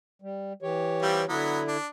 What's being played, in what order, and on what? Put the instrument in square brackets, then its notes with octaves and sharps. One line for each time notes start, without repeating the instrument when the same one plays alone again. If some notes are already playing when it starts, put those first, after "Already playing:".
[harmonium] G3
E3 G4 C#5
[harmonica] G3 C4 F4
[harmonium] D3 E4 [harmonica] F#3 B3
[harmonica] D4